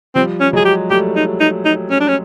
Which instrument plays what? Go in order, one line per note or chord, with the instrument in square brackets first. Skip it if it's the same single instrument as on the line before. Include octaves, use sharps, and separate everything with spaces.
[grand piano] F3 G3 [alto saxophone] C4
[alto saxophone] C#4
[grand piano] F#3 G#3 [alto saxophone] G#4
[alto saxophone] G4
[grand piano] G3 A3 [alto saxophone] G4
[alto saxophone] D#4
D#4
D#4
C#4
D4
C#4